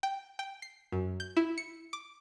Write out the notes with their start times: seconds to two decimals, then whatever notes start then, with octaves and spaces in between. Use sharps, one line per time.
0.03 G5
0.39 G5
0.62 C7
0.92 F#2
1.20 G6
1.37 E4
1.58 C#7
1.93 D6